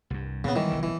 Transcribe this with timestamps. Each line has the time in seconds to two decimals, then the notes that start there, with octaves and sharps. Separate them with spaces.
0.10 C2 G2
0.44 A#2 C#3 B3
0.55 D#3 E3 G3 G#3
0.70 F1 B1 C#3
0.83 E3